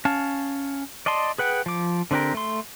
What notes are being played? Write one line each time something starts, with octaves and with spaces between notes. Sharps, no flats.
C#4 F5 A5
D5 D#5 A5 C6
G#4 B4 F#5 G5
F3 D6
D3 C4 D4 G4 A#4
A3 C6